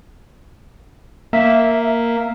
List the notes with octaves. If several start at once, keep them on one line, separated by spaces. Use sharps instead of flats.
A#3 E5